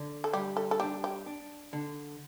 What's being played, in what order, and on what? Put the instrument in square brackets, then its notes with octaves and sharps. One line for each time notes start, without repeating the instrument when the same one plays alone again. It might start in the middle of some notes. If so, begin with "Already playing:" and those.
Already playing: [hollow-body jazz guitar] D3
[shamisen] A4
[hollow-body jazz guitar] G3 [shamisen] G4
[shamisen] A4
A4
[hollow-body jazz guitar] D4 [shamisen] G4
[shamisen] G4
[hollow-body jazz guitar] D4
D3